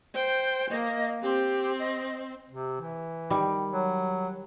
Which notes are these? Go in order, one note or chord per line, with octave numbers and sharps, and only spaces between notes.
C5 G5
A#3 D#5
C4 G4
D#5
C3
E3
D#3 G3
F#3